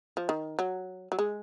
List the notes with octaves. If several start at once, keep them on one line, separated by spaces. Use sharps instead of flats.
F3
D#3
F#3
F#3
G#3